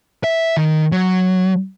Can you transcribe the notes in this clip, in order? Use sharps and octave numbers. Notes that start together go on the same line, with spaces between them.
E5
D#3
F#3